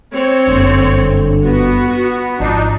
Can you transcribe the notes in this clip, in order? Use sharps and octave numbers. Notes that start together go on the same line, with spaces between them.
C4 C#5
F#1 G2 D3
B3 F#4
G#1 F3 D4 D#4